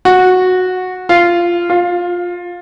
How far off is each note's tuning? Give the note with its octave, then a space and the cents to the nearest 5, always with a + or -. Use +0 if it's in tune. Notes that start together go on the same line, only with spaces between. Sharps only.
F#4 -10
F4 -10
F4 +15